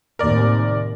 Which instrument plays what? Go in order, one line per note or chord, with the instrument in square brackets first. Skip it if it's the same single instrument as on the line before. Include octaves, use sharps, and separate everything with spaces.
[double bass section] D#2 A2 C3 [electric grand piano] A#4 D5